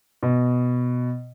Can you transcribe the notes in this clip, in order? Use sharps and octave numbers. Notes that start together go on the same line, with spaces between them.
B2